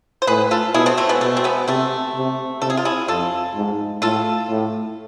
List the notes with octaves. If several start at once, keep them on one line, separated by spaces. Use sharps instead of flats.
C5
A2 G#4 B4
F4 A4
B2 E4 G#4
A3 C4
A3 C4
G#3 B3
B2 A3
C4
G#3 B3
C3 A3 C4
C3
C3 A4
G#4
F4
E4 G#4
F2 F4 A4
G#2
A2 F4 A4
A2